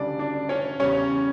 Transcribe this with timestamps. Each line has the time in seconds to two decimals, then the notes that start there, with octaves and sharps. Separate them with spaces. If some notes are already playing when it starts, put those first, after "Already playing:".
Already playing: D2 C#3 G3 D4 D5
0.19 D4 D5
0.49 C#4 C#5
0.80 E2 C#3 G3 C#4 C#5